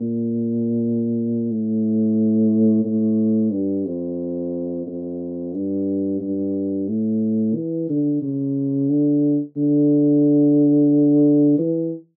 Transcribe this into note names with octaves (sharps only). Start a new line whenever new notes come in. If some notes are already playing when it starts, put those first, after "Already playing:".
Already playing: A#2
A2
A2
G2
F2
F2
G2
G2
A2
E3
D3
C#3
D3
D3
E3